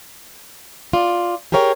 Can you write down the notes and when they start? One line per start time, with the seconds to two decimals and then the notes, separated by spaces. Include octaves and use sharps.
0.93 F4 D5
1.52 G4 G#4 A#4 C#5 E5 G5